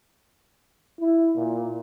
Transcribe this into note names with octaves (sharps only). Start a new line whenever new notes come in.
E4
A#2